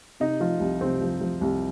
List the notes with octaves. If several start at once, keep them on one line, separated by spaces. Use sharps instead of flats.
C3 D#4
F3 F4
C2
C3 C4
F3
F3
C2